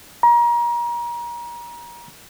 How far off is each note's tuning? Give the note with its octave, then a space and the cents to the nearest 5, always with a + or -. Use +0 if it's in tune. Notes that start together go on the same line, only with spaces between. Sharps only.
A#5 +30